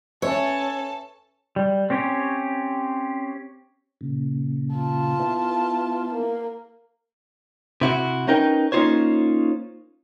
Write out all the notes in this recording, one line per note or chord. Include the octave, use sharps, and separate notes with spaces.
C#4 A4 B4 C#5 E5 A5
G3
C4 C#4 G4 C#5 G#5
A#2 C#3
F4 A5
B3 E4
A#3
C3 E4 F#4
C#4 D#4 A#4 B4 G5
A#3 C#4 D#4 F4 C5 C#5